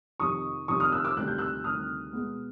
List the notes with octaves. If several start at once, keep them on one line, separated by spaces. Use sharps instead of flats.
F2 C3 D#3 C#6 D#6
F2 C3 D#3 C#6 D#6
D#6 F6
E6 F#6
D6 E6
D2 C3 D#3 G3 C4 F#6
G6
E6 F#6
D2 C3 D#3 G3 C4 D#6 F6
B2 G#3 B3